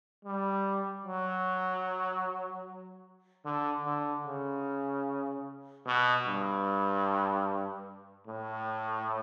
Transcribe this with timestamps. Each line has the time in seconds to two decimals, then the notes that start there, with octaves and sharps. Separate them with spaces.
0.25 G3
1.05 F#3
3.45 D3
3.85 D3
4.26 C#3
5.87 B2
6.27 G2
8.27 A2